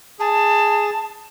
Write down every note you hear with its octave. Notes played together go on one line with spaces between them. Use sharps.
G#4 A5